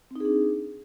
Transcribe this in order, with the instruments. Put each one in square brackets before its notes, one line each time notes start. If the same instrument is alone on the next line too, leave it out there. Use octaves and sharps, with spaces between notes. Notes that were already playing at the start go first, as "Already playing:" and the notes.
[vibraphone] C4
D#4
G#4
D4